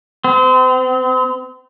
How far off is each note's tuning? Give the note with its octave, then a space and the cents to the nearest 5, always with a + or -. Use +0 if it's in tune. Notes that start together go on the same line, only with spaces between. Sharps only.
C4 -35